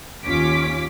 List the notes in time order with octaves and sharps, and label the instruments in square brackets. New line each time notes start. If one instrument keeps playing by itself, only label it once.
[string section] D#2 C#4 F4 D6 B6